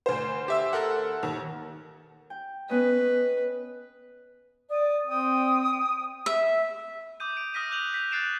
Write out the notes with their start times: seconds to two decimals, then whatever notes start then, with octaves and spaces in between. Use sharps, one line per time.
0.06 D2 C5
0.48 G4 E5 E6
0.73 A4 A#4 F#5
1.23 D#2
2.30 G5
2.69 B3 C#4 B4 D#5
4.68 D5 D#6
5.07 C4 G5 D#6
6.26 E5
7.20 D6 D#6 G6 D#7
7.37 G6 D7 F7
7.54 D#6 F6 A#6 B6 D#7
7.70 D6 E6 F#6 G6 F7 F#7
7.93 G6 B6 D#7 F7
8.11 F#6 A6 C7 D7 E7 F7